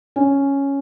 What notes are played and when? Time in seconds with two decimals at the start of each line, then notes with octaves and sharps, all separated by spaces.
0.16 C#4